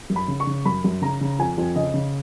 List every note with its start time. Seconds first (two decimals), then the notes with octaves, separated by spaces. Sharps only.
0.10 F#2
0.16 B5
0.28 C#3
0.40 C#6
0.47 C#3
0.65 F#2 B5
0.84 F#2
1.02 C#3 A#5
1.21 C#3
1.39 F2 G#5
1.58 F2
1.75 C#3 D#5
1.94 C#3